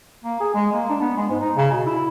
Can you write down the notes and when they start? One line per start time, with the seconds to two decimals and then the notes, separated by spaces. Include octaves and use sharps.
0.24 A#3
0.40 G#4
0.54 G#3
0.72 A#3
0.89 D4
1.01 B3
1.17 G#3
1.30 G#2
1.41 D#4
1.57 C#3
1.71 B2
1.86 E4